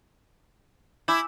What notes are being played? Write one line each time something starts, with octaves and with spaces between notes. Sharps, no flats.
E4 G#5 D6 G6